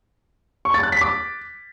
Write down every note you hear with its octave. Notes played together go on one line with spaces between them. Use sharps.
C#6
A6
F#6
B6
D6